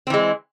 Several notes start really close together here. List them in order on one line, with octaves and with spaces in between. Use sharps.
C4 E3 G#3